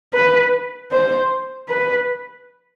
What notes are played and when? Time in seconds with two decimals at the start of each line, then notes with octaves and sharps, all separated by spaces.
0.13 B4
0.91 C5
1.69 B4